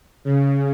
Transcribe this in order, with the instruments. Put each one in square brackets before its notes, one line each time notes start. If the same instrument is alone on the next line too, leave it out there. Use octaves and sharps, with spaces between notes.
[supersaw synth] C#3